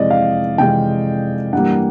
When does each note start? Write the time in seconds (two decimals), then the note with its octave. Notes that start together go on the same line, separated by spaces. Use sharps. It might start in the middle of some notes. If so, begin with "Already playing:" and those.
Already playing: F2 C3 E3 G#3 D5 D#5
0.10 F5
0.58 F2 C3 E3 G#3 G5
1.52 G2 E3 G3 A#3 F#5